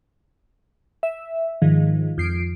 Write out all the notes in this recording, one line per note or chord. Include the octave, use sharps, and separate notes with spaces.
E5
G#2 D#3 F3
F2 C7 D7